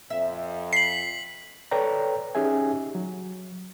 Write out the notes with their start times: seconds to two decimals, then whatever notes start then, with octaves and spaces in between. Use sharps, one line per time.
0.10 F2 E5
0.73 B6 C7 F#7
1.71 A4 B4 C#5 D5 G5 A#5
2.35 C#4 D#4 G4 G#4 E5 G#5
2.95 F#3